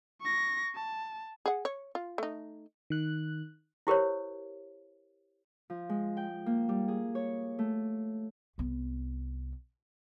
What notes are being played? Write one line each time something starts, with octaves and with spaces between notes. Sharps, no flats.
C#6 A#6
A5
G#4 F#5
C#5
F4
A3 D#4
D#3 F#6
E4 G4 A#4 C5 C#5
F3
G#3
G5
A#3
G3
G#4
C#5
A3
C2 B3